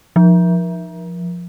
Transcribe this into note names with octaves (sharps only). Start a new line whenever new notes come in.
F3